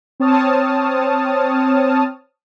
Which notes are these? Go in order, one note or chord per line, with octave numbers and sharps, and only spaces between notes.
C4 C#5 A5 D#6 F6